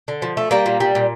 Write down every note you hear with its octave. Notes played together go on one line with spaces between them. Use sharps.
D3
F3
A3
G3 A#3
A#2
G3
A#2